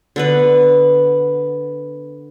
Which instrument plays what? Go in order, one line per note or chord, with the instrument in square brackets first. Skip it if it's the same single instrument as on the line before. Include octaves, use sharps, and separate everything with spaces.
[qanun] D3 B3 B4